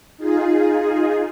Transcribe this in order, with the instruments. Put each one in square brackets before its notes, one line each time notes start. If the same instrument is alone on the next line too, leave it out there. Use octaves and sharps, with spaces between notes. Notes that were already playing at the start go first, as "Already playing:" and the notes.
[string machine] D#4 F4 G#4